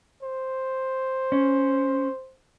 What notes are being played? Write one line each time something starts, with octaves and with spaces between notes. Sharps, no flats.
C5
C#4